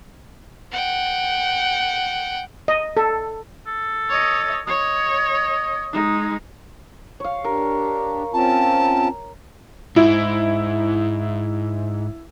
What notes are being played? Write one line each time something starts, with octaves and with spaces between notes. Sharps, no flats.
F#5 G5
D#5
A4
A4
C#5 D#5
C#5 D#5
G#3 D#4
C#5 F5
D4 G4 A#4
C4 C#4 F4 A5
G#2 E4